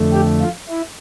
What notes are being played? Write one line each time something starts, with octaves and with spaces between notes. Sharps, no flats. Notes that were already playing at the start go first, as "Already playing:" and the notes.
Already playing: F2 D3 A3
G4
F4
E4